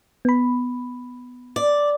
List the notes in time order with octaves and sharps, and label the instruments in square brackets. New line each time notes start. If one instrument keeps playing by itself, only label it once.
[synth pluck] B3 B5
[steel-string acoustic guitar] D5